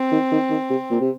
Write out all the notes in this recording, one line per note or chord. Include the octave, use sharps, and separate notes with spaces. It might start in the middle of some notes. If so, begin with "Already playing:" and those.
Already playing: C4
D#3
D#3
D#3
C3
A#2
C3